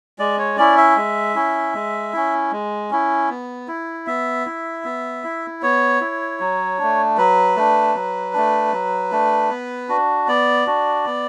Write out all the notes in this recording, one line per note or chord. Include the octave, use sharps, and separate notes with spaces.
G#3 D5
C#5
C#4 E4 D5
E5
G#3
C#4 E4
G#3
C#4 E4
G#3
C#4 E4
B3
E4
B3 E5
E4
B3
E4
B3 C#5
E4
F#3
A3 D4
F#3 B4
A3 D4
F#3
A3 D4
F#3
A3 D4
B3
D4 F#4
B3 D5
D4 F#4
B3